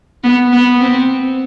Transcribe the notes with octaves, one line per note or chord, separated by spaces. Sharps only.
B3
B3
C4